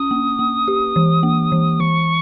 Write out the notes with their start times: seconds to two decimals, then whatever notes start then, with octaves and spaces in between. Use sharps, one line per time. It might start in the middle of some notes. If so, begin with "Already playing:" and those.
Already playing: C#4 D#6
0.11 A#3
0.39 A#3
0.68 G4
0.96 E3
1.23 A#3
1.52 E3
1.80 E3 C#6